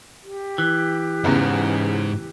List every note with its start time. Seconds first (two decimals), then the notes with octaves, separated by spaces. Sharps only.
0.23 G4
0.58 E3
1.24 E2 G#2 C#3 B3